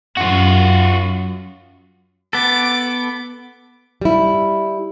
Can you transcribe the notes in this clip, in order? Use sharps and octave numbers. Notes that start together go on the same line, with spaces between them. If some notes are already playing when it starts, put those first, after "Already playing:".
F#2 F4 F#4
B3 A4 D6
G3 E4